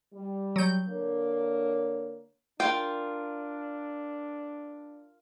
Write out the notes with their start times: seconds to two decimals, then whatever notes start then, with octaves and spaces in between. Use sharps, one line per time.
0.13 G3
0.56 F#3 G6
0.88 D3 A#3 C#5
2.60 D4 F4 A#4 G5